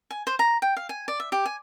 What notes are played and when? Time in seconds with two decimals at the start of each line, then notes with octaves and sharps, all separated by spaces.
0.11 G#5
0.27 C5
0.39 A#5
0.62 G5
0.77 F5
0.89 G#5
1.08 D5
1.20 E5
1.32 G4
1.46 G#5